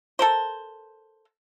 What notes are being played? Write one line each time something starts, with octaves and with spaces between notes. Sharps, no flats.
A4 A#4 C5